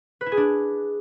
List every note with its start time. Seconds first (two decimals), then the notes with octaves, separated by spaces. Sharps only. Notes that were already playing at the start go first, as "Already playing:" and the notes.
0.21 B4
0.26 E4
0.32 G#4
0.37 D4